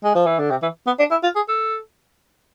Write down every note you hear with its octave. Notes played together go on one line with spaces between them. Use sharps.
G#3
F3
E3
D3
C3
E3
B3
D4
E4
F4
G#4
A4